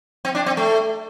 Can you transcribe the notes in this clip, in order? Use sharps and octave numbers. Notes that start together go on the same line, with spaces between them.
C4
D4
C4
A3